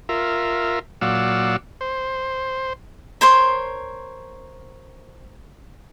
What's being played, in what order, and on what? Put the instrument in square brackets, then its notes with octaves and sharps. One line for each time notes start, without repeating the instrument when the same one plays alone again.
[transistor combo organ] F4 A#4 E5
A#2 F#3 D5 F5 F#5 E6
C5
[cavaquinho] A#4 C5 C#5 C6